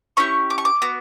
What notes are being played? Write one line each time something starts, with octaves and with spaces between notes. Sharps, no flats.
C#4 E4 G4 C#6
D6
C#6
D6
B3 F#4